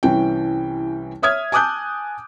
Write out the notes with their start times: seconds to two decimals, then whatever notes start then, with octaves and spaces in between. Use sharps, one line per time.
0.03 C2 E3 C#4 G5
1.22 C#5 E5 D#6 F6 G#6
1.52 G#5 A5 D6 D#6 F#6 G6